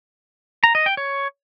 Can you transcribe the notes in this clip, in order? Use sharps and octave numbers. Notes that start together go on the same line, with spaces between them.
A#5
D#5
G5
C#5